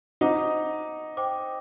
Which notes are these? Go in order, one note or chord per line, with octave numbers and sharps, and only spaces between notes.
D#4 C5 F#5 A#5 D6
C5 G5 D6